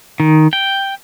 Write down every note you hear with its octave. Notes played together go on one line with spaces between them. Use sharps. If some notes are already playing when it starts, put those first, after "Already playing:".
D#3
G5